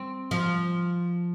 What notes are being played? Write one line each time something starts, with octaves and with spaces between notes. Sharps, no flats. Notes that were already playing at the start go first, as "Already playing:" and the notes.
Already playing: C4
F3